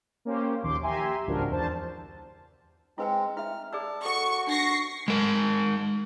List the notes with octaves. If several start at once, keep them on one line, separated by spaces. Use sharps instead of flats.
A#3 C#4 G4 C5
A#1 D#2 C6 D6
G4 E5 G#5 A#5 C6
G#1 C#2 F3 D4 F#4 A#4
E2 D4 C5 A5
G#3 C4 E4 B4 G5
E4 E5 F6
G#4 D5 A5 E6
F#4 A4 C#6
D4 C#6 A#6 C7
G#3 A#4